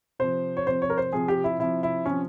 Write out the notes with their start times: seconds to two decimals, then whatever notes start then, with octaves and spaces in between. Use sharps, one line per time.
0.19 C3 F3 C5
0.57 C#5
0.66 C3 F3 C5
0.82 C#5
0.90 A#4
0.98 C5
1.12 C3 F3 G#4
1.28 G4
1.44 E4
1.59 C3 F3 E4
1.83 E4
2.06 C3 F3 C#4